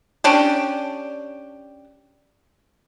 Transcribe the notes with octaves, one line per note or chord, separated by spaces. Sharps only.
C#4 D4 G4